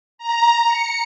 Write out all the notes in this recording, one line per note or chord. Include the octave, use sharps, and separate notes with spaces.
A#5
C#7